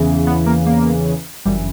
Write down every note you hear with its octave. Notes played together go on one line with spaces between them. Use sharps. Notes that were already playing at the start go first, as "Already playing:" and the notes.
Already playing: E2 C#3 E3
B3
A#3
A#3
G1 F#2 E3 G3